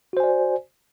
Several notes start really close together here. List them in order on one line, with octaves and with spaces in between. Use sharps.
F#4 C5 G#5 D5